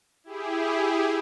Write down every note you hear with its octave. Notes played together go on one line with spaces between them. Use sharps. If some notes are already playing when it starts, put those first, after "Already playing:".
E4 G4 G#4